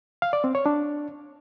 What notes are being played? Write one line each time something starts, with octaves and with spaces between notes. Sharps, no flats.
F5
D5
C4
C#5
D4